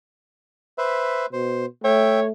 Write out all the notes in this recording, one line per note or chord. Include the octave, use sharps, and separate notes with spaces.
B4 C5 E5
B2 C5
A3 C#5 E5 G5